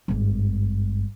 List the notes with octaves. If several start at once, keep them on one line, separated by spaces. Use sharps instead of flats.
G#1 G2